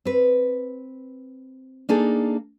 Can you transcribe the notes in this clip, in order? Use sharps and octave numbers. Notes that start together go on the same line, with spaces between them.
C4 B4
A#3 D4 D#4 G#4 A4